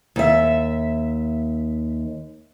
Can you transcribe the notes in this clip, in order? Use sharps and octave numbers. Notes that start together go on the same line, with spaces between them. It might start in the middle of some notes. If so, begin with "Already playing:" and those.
D#2 E5